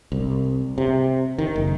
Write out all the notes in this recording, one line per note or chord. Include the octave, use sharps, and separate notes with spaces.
C2
C3
D#3
F#1